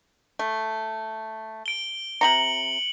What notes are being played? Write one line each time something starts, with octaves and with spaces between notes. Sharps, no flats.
A3
D7 G7
C3 F4 A#5 C#7 F#7